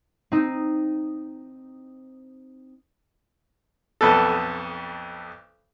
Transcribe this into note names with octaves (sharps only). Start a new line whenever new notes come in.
C4 D#4
B1 F2 B3 A4